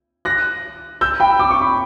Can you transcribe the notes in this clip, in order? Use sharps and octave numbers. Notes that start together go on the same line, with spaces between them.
F#6 A#6
E6 G6
G5 B5
D6
C#6
B5